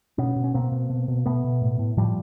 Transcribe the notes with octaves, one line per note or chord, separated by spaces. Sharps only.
B2 B3 C#4
B2
C#4
B2 A#3 C4
B2
B2
B2
B2 A3 B3
B2
A2
A2
A2 F3 G3